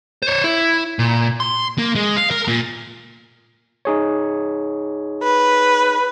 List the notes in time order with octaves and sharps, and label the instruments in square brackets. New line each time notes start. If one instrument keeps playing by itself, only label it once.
[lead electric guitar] C5 C#5
E4
A#2
C6
[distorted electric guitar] A#3
G#3
F5
A#4
A#2
[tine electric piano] D#4 G#4 C#5
[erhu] B4